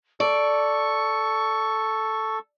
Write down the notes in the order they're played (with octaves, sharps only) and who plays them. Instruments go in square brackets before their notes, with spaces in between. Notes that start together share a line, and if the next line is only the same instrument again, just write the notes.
[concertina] A4 [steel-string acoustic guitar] D5 [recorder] C#6